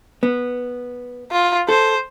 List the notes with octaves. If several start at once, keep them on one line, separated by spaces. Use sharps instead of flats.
B3
F4
A4 C5